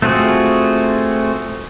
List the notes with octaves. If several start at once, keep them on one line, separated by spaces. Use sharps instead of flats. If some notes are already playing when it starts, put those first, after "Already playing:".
A3 C4 F4 F#4 G#4